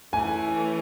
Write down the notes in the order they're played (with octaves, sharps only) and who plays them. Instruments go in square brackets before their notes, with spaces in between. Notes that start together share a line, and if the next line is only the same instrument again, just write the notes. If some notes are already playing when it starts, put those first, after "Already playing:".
[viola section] E3 A3 C#4 [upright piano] G#5